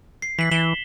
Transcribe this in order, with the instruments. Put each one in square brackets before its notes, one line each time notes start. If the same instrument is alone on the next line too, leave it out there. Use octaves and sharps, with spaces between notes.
[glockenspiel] C7
[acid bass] E3 [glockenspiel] B6 F#7
[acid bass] E3 [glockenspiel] E7 F#7 G7